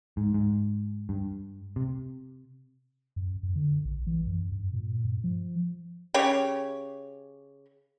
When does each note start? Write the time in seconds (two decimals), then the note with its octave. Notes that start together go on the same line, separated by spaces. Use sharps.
0.17 G#2
0.34 G#2
1.09 G2
1.76 C3
3.16 F#2
3.43 F#2
3.56 D3
3.85 A#1
4.07 E3
4.27 F#2
4.52 G2
4.74 A#2
5.05 G2
5.24 F3
6.14 C#3 G4 C#5